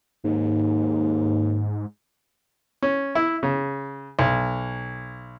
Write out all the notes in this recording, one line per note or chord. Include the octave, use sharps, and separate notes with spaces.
D#2 G#2
C#4
E4
C#3
B1